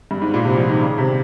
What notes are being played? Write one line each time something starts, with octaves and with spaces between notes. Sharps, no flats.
G2
G#2
A#2
C3
F3
D#3
C#3
C3